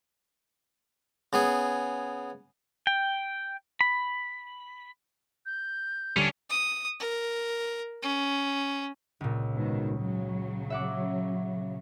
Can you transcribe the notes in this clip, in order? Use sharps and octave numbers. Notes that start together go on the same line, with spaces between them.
C#3 B3 G#4
G5
B5
G6
D#1 D3 G3 C#4 D4
D#6
A#4
C#4
C#2 A#2
G#2 B2 D#3
C#3 F#3
E5 F#5 D6